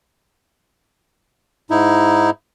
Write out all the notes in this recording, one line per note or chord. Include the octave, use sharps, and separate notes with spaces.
G#2 D#4 E4